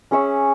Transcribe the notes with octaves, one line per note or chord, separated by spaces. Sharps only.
C#4 G#4 C#5 E5